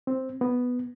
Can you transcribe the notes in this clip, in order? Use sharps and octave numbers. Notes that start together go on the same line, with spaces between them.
C4
B3